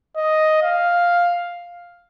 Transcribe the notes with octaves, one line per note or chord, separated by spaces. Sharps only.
D#5
F5